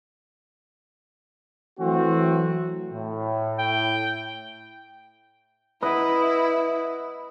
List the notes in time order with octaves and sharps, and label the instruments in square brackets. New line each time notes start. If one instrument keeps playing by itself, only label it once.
[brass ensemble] E3 F#3 A3 C4 F#4
[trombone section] A2
[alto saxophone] G5
[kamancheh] E4 [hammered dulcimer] B4 D#5 F#5